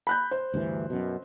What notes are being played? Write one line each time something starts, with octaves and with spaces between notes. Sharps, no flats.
B5 F#6 G6
C5
D2 G2 E3
F#2 B2